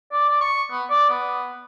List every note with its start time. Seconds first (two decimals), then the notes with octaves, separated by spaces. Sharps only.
0.12 D5
0.28 D5
0.40 C#6
0.71 B3
0.90 D5
1.09 B3